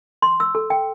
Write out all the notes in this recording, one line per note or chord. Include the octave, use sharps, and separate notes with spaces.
C6
E6
A4
G5